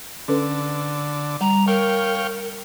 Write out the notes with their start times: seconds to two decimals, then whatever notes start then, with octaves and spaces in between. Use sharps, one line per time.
0.28 D3 C#4 A4 B4
1.41 G3 A#5
1.67 A#4 C#5 F5 G5